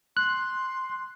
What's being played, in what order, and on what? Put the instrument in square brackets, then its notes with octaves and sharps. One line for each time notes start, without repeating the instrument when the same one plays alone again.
[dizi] C6 [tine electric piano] F#6